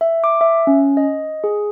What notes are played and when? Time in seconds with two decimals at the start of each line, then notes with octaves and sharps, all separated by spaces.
0.01 E5
0.24 D6
0.41 E5
0.67 C#4
0.97 D#5
1.44 G#4